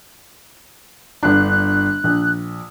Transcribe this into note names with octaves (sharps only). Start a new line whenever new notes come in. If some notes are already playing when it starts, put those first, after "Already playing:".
G1 D4 F#6
A#1